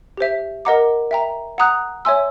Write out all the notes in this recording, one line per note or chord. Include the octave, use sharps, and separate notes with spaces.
G4 C5 E5
A#4 D#5 F#5 A#5 D6
E5 G5 A#5
F#5 A#5 D#6 F#6
C#5 E5 G#5 C6 E6